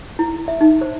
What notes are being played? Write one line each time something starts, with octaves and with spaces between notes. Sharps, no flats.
E4
E5
D#4
C5